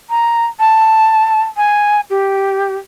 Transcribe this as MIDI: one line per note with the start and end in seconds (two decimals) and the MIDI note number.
0.10 0.46 82
0.59 1.42 81
1.57 2.00 80
2.10 2.75 67